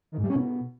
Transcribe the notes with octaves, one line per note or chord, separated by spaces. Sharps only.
D#3
G#2
G3
C#4
B2